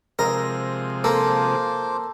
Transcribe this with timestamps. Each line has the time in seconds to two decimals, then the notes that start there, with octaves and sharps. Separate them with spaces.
0.19 C3 F3 G#3 A#4 D#6 E6
1.04 A#3 F4 A4 C5 D6